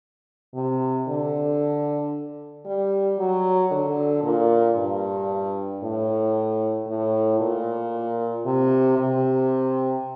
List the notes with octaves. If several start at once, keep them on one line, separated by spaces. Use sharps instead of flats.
C3
D3
G3
F#3
D3
A#2
G2
A2
A2
A#2
C3
C3